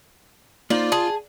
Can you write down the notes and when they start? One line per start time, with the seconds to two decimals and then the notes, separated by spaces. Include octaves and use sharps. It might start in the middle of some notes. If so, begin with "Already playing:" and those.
0.70 A#3 D#4 F4 C5 D5
0.92 G#4 A5